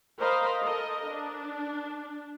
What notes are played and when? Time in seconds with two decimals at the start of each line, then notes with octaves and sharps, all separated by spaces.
0.21 A#4 C5 D#5 F5 B5
0.63 A4 A#4 D#5
1.09 D4